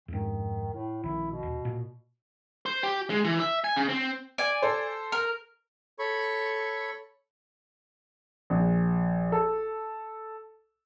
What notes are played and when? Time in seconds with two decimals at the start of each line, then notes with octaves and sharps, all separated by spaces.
0.08 F2 G#2 D#3
0.74 A2
1.04 A#1 D#3 E4
1.31 B2
1.43 D#1
1.65 A#2
2.66 C5
2.83 G4
3.10 G#3
3.24 E3
3.40 E5
3.64 G#5
3.76 C#3
3.89 C4
4.38 D5 G#5
4.62 A4 C5
5.12 A#4
5.99 A4 C#5 B5 C#6
8.50 A#1
9.32 A4